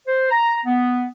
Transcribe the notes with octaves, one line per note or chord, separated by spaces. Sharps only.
C5
A#5
B3